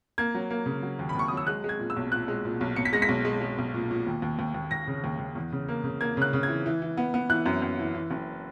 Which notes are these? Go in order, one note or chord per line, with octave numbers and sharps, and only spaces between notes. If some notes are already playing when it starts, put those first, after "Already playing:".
A#3 G#6
F#3
A#3
C#3
F#3
D#2
B5
D#2 C#6
F#3 D#6
E6
G#3 F#6
G#3
G#6
A#2
E6
B1
A#2 F#6
G#3
A#2
B1
B1 C#7
B6
G#3 A#6
B6
B1
G#3
G#3
B1
A#2
A#2
D#2
D#2
D#2
D#2
D#2 A#6
C#3
D#2
D#2
E2
C#3
A#3
C#3
A#3 G#6
C#3 F#6
C#3
G#6
E3
E3
E3
B3
B3
E3 F#6
F#2
F#2
E3
E3
F#1